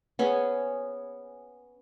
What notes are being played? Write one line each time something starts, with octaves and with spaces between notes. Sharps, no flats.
B3 C#4 G#4